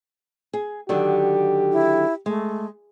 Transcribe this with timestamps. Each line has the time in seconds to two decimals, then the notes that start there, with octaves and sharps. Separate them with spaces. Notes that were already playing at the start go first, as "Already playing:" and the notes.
0.53 G#4
0.89 D3 D#3 F#3 G4
1.72 E4
2.26 G#3 A3